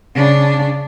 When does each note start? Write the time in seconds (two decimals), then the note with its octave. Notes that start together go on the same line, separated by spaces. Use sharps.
0.15 C#3 D4